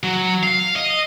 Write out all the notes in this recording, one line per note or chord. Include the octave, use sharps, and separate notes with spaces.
F#3
F5
D#5